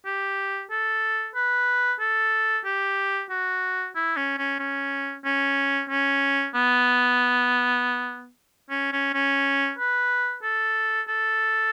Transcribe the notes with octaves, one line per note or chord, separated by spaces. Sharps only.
G4
A4
B4
A4
G4
F#4
E4
C#4
C#4
C#4
C#4
C#4
B3
C#4
C#4
C#4
B4
A4
A4